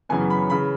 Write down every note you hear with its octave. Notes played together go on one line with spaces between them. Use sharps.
F#2 C#3 E3 B3 G#5
B5
C#3 E3 B5